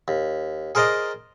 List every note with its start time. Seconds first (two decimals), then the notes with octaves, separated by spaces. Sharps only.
0.08 D#2
0.75 G#4 A#4 C5 D5 D#5 A#5